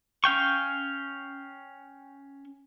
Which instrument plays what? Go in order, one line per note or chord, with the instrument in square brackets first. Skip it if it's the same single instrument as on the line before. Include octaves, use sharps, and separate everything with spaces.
[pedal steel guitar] C#4 F5 G5 C#6